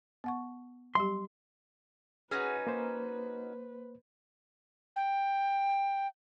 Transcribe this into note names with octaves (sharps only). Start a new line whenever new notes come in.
B3 F#5 C#6
F#3 G3 G4 C6
C#4 D#4 F#4 G#4 B4 F#5
A#3 C5
G5